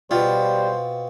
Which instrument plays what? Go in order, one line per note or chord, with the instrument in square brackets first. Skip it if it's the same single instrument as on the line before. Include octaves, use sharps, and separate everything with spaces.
[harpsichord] B2 C4 [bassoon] G3 [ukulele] F4 [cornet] C5